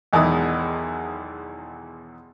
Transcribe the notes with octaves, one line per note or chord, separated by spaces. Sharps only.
B1 E2 D#3 G#3 E4 D#6